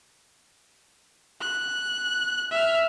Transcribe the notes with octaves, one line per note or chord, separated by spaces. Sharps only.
F#6
E5 F6